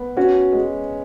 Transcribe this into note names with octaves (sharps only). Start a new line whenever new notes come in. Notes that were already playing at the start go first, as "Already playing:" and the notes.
Already playing: B3
C#4 F#4
G#3